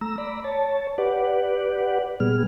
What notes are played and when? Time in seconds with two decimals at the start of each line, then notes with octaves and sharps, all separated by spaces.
0.01 A3 A#5 E6
0.18 D5 A#5 B5
0.44 C#5 A5
0.98 G4 B4 D5 F#5
2.20 A#2 G3 B3 G#4 F6